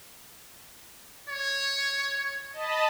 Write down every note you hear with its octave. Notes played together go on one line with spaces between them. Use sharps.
C#5
D#5 A5 B5